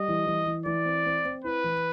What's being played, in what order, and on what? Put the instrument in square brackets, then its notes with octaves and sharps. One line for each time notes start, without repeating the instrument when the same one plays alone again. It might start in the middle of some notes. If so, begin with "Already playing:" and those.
Already playing: [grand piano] G3 [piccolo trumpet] D#5
[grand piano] E3
E3
E3
[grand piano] E3 [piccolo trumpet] D5
[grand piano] C4
C4
C4
[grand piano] E4 [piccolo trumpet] B4
[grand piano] E3